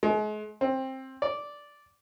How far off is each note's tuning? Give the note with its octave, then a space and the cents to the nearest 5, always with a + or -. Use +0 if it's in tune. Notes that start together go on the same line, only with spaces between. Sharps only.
G#3 +40
C4 +15
D5 -5